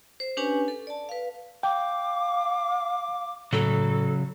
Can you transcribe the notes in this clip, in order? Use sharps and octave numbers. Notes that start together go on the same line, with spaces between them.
C5
C#4 D4 G4 B4 C#5 G#5
A4
D5 A5
B4 F5
F5 G5 D6
A2 C#3 F#3 A4